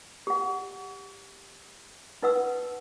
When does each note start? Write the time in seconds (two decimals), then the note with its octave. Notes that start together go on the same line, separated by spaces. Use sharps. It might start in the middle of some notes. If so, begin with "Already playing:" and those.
0.27 G4 F#5
2.22 D#4 B4 F#5 E6